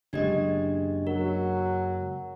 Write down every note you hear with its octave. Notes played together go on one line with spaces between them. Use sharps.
F#1 G#3 D4 G4 D#5
F#3 A#4